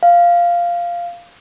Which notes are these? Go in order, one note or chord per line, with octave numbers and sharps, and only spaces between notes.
F5